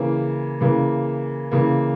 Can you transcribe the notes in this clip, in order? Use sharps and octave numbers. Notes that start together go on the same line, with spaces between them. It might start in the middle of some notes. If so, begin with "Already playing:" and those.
Already playing: C#3 E3 A#3
C#3 E3 A#3
C#3 E3 A#3